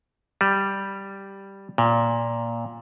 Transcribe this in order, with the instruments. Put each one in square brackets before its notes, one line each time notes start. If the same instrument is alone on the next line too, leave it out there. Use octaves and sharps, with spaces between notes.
[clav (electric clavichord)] G3
A#2